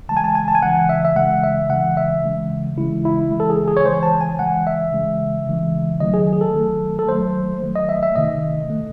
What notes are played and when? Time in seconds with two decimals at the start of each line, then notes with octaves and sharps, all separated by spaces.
0.09 C#3 E3 G#3 A5
0.17 G#5
0.24 A5
0.35 G#5
0.48 A5
0.55 G#5
0.62 C#3 E3 G#3 F#5
0.89 E5
1.05 E5
1.16 C#3 E3 G#3 F#5
1.43 E5
1.70 C#3 E3 G#3 F#5
1.97 E5
2.24 C#3 E3 G#3
2.78 C#3 E3 G#3 E4
3.05 E4
3.31 C#3 E3 G#3
3.40 A4
3.50 G#4
3.68 G#4
3.77 C#5
3.85 C#3 E3 G#3 C5
4.03 A5
4.21 G#5
4.39 C#3 E3 G#3 F#5
4.67 E5
4.93 C#3 E3 G#3
5.47 C#3 E3 G#3
6.00 D#3 F#3 A3 D#5
6.14 G#4
6.33 G#4
6.41 A4
6.55 D#3 F#3 A3
6.99 A4
7.09 D#3 F#3 A3 C5
7.62 D#3 F#3 A3
7.75 D#5
7.89 E5
8.03 E5
8.16 C3 D#3 A3 D#5
8.70 C3 D#3 A3